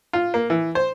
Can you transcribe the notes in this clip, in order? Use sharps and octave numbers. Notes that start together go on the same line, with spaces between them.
F4
A#3
E3
C5